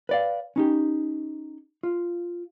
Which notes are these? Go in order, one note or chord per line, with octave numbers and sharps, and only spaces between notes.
B4 D5 F5
C#4 D#4 G4
F4